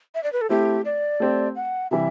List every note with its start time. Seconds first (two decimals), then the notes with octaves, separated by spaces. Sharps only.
0.15 E5
0.23 D5
0.32 B4
0.41 A4
0.49 A3 C4 E4 G4
0.85 D5
1.20 A3 C4 G4
1.55 F#5
1.91 C3 E3 G3 E5